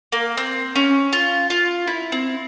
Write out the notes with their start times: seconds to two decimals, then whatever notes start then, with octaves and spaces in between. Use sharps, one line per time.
0.12 A#3
0.37 C4
0.76 C#4
1.13 F4
1.50 F4
1.87 E4
2.12 C4